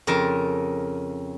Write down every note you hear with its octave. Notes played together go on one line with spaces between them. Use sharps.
F2 C#3 A#4 A5